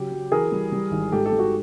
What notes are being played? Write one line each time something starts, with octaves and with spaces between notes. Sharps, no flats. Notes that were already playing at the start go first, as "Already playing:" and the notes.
Already playing: C#3 F#3 G4
F#3
E3 G#4 A#4
G3
G3
G#1
G#2 G4 A4
G4 A4
G#2
F#4